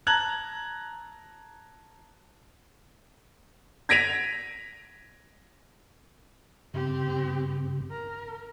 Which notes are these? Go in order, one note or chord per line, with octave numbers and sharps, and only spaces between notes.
A5 A#5 F#6 G#6 F#7
G#6 A#6 B6 D7 D#7 F7
G2 C#3 C4 G4
A#4